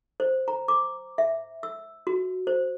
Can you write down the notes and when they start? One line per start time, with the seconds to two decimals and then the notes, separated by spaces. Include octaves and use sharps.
0.20 C5
0.48 A#5
0.68 D6
1.18 E5
1.63 E6
2.07 F#4
2.47 C5